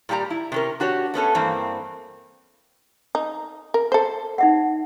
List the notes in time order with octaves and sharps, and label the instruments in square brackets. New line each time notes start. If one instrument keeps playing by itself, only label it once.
[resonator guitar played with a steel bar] A#2 G3 G4 D5 A#5
E4
C3 C#4 A#4
D4 F#4 G4 C#5
A3 B3 C#4 A4
G2 E3 A#3 C4
[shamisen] D#4
A#4
A4 C5
[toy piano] D#4 E5 F#5